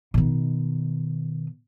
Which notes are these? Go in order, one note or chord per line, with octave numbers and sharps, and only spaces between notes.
B2 D#3